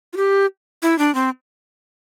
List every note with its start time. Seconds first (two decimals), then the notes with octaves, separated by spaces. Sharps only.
0.13 F4
0.17 G4
0.82 E4
0.99 D4
1.15 C4